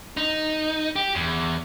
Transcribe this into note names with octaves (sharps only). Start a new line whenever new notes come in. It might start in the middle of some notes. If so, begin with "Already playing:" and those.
D#4
G4
E2